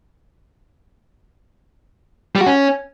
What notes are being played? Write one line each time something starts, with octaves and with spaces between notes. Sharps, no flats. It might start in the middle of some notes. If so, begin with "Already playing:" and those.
G3
F#4
C#4